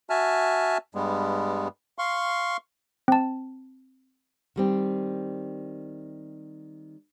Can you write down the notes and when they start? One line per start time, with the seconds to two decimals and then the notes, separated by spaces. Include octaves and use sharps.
0.10 F#4 E5 G#5 A5 F6
0.95 G2 G3 G#3 B3
1.98 F5 C6 C#6
3.08 C4 A5
4.56 D#3 G3 C4